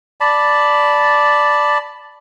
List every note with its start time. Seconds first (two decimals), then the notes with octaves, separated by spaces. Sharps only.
0.21 D5 A5 B5